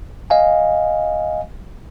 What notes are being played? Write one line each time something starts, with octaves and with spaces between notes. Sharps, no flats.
D#5 F5 G#5